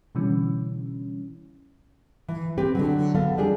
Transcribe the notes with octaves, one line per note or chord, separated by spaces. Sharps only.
B2 D3 E3 G3 C#4
E3
C4 G4 B4
D3 F#3
B3 A4 F5
F2 G3 D4 G#4